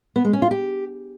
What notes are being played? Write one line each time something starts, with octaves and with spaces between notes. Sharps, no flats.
B3
G#3
C#4
F4
G4